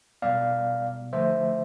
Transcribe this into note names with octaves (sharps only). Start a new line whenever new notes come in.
B2 G3 B3 D5 F5
D3 F3 A3 C5 E5